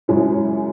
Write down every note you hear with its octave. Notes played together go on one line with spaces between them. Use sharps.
F#2 C#3 G#3 C#4 E4